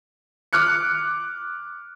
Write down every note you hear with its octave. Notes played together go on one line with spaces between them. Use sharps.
D6 F6 F#6 C#7